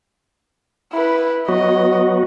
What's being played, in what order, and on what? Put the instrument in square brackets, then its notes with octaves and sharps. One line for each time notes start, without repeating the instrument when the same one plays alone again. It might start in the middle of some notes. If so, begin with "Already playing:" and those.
[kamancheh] E4 B4
[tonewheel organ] F#3 B3 F#4 [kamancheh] D#5